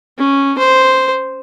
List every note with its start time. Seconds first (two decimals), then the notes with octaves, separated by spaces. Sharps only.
0.18 C#4
0.58 C5